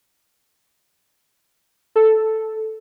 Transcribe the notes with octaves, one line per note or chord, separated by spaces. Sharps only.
A4